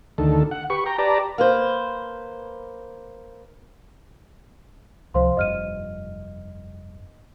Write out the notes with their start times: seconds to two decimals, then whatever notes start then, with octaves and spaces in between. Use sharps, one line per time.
0.18 D2 D#3 A4
0.51 F#5
0.70 G4 B4 C#6
0.86 G5 A#5
0.98 G4 B4 D5 A5 A#5
1.38 A#3 B4 C5
5.14 C#2 C3 F3 C5 F5 C6
5.37 F1 G2 D#5 F6 D#7